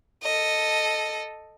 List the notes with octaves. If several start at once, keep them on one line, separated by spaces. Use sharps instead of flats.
A4 D#5